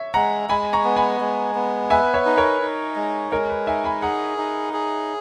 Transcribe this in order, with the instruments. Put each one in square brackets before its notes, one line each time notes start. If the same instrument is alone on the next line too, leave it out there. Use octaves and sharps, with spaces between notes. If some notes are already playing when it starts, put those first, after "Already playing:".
Already playing: [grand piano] C#5 E5
[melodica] G#3 [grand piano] F#5 A#5
[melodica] G#3 [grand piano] G#5 B5
[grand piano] A#5 C#6
[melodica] B3
[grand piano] G#5 B5
[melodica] G#3
B3
[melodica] B4 [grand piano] E5 G#5
[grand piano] C#5 E5
[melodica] D#4
[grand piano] A#4 C#5
[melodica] D#4
G#3
[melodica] G#3 [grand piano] A#4 C#5
[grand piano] B4
[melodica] D#4 [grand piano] E5 G#5
[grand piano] G#5 B5
[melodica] G#4 [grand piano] F#5 A#5
[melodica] D#4
G#4